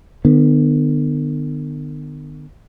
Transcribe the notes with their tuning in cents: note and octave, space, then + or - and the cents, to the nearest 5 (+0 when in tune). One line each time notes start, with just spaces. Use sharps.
D3 +45 B3 +15